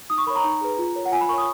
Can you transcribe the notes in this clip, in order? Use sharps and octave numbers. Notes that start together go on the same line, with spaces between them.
D#4 D#6
C#6
A#4 C#5 B5
A#5
D#4
G#4 B4
F4
A#4 C#5
F#5
F4 G#5
B5
A#4 C#5 C#6
D#6